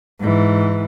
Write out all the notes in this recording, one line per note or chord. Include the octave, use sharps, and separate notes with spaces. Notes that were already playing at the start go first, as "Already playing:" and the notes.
G#2 E3